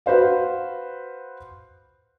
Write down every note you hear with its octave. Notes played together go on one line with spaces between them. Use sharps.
F#4 B4 C5 F5